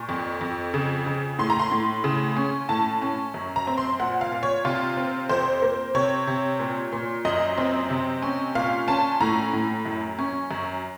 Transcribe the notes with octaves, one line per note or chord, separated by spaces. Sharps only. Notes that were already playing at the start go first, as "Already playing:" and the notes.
Already playing: A#2 C#6
F2
F2
C#3
C#3
A2 C6
A#5
C6
A2
C#3
C#4
A2 A5
C#4
F#2
A#5
C4
C6
A#2 F#5
F5
A#2
C#5
C3 F4
C4
F2 C5
A#3
C3 C#5
C3
A#2
A#2
F#2 D#5
C4
C3
C#4
A#2 F5
C#4 A5
A2 A#5
A2
F#2
C#4
F#2